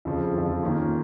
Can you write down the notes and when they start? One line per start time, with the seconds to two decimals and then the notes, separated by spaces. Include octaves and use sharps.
0.05 F2 C#3 F3
0.34 F2 C#3 F3
0.63 D#3 A#3 C#4 F4